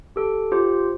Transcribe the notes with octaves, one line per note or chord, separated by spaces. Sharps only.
G4 A4
F4 G4 C5